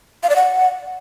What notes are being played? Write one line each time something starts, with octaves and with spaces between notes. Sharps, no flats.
F5
D5
F#5